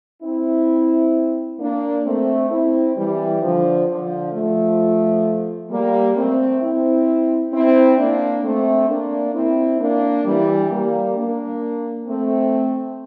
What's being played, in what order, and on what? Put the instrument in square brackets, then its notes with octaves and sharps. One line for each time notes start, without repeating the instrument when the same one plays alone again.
[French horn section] C4 E4
A#3 D4
A3 C4
C4 E4
E3 G3
D3 F3
D3 F3
F3 A3
G3 A#3
A3 C4
C4 E4
C4 E4
A#3 D4
A3 C4
A#3 D4
C4 E4
A#3 D4
E3 G3
G3 A#3
A#3 D4
A3 C4